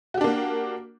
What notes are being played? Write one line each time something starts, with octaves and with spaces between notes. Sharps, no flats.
A#3 D4 F#4 G4